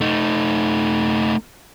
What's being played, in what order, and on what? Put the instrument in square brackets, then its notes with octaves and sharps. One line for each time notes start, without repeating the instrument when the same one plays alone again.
[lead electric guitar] A3 D#4